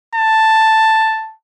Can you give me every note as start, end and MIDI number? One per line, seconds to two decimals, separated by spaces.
0.15 1.34 81